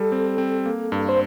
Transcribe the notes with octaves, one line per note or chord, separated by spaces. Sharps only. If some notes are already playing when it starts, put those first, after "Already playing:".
Already playing: G3 A4
C4
C4
A#3
G2
C5